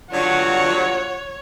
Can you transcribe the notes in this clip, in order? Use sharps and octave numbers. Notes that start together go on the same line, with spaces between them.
G2 D3 F#3 F4 C#5 F#5